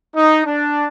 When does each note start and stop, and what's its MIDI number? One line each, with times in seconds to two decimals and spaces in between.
0.16 0.42 63
0.46 0.88 62